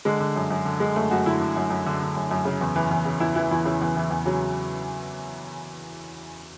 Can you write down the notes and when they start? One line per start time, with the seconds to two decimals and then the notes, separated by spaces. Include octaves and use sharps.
0.05 D3 G#3
0.20 D3
0.36 F#2
0.51 F#2
0.65 D3
0.80 D3 G#3
0.96 F#2 A3
1.11 F#2 F#4
1.26 D3 E4
1.41 D3
1.56 F#2
1.70 F#2
1.86 D3
2.01 D3
2.16 F#2
2.31 F#2
2.45 C#3
2.61 E2
2.76 E3
2.91 E2
3.06 C#3
3.20 E2 E4
3.35 E3 E4
3.51 E2 E4
3.65 C#3 E4
3.81 E2
3.97 E3
4.10 E2
4.25 C#3 F#3